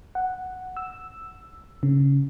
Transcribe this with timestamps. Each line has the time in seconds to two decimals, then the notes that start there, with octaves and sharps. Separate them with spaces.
0.15 F#5
0.77 E6
1.83 C#3